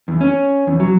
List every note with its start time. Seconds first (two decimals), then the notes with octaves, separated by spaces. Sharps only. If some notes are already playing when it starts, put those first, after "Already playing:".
0.08 E2
0.21 C#4
0.67 E2
0.80 F#3